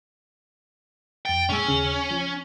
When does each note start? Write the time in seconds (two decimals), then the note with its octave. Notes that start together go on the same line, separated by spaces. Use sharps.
1.25 F2 G5 A6
1.49 A#2 G#3 C#4 E6
1.67 D#2 C#3 F6
2.11 F3